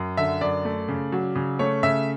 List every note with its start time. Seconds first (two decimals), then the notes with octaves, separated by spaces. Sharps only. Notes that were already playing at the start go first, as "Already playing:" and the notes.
Already playing: F#2
0.17 D3 E5
0.41 F#2 D5
0.65 A3
0.88 C#3
1.12 F#3
1.35 C#3
1.59 A3 C#5
1.83 C#3 E5